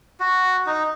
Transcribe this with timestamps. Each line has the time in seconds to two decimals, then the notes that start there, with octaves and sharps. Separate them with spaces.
0.20 F#4
0.66 D#4